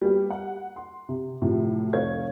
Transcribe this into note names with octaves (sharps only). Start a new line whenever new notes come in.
G3 A#3 B3 G4
F#5
C6
C3
A2 C3 F3 F#3
F1 C#5 F5 G#6